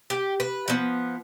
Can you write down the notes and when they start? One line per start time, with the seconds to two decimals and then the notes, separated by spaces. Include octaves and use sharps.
0.10 G4
0.40 B4
0.68 F3 B3